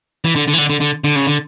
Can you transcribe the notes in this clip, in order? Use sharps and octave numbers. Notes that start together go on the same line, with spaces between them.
E3
D3
D3
E3
D3
D3
D3
D3
C#3
D3